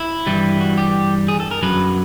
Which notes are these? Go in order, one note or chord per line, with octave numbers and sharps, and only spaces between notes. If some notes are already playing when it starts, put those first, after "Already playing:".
Already playing: E4
G2 E3 G3
F#4
G4
G#4
A4
A#4
F#2 D3 F#3 B4